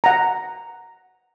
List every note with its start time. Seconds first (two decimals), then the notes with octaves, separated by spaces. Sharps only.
0.04 F#5 A#5